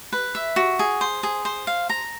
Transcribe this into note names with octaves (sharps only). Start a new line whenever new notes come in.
B4
E5
F#4
G#4
C5
G#4
C5
F5
A#5